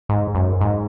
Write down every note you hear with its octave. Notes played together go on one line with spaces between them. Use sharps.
G#2
F#2
G#2